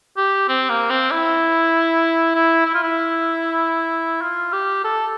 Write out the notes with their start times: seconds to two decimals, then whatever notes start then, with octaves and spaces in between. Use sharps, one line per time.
0.17 G4
0.49 C4
0.70 A#3
0.90 C4
1.11 E4
2.35 E4
2.66 E4
2.74 F4
2.83 E4
4.21 F4
4.53 G4
4.84 A4